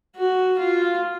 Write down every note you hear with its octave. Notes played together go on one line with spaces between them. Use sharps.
F#4
F4